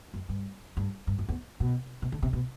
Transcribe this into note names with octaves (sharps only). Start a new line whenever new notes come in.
F#2
G2
G2
G2
F#2
E2
B2
B2
D3
C3
B2